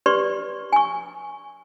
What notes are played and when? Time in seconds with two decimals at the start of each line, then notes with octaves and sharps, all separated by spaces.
0.06 G4 B4 D5 C6 C#6
0.73 G#5 C#6